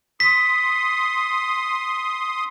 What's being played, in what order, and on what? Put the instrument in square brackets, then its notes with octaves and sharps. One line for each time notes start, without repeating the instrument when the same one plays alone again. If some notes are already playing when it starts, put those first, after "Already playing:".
[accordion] C6 D#6 [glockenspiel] B6